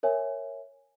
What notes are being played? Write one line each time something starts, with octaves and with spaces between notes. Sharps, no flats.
A#4 C#5 E5 G#5